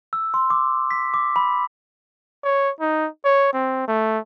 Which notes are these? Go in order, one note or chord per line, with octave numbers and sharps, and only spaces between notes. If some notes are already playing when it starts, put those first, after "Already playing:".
E6
C6
D6
B6
D6
B5
C#5
D#4
C#5
C4
A3